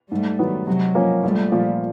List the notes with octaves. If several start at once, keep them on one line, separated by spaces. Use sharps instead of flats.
G#2 G3 A3
D#3 F#3 B3
C3 F#3 G#3
F3 A#3 C#4
A#1 G3 A3
A#2 F3